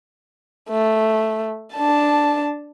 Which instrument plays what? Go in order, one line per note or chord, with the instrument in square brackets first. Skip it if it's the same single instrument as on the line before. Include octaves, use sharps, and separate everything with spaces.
[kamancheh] A3
D4 A5